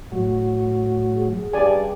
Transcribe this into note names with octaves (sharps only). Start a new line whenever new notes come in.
A2 F#3
G#4
G2 G#4 D5 G#5